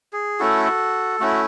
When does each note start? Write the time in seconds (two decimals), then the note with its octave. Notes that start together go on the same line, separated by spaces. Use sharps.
0.13 G#4
0.40 A3 C#4 E4 F#4 A4
1.20 A3 C#4 E4 F#4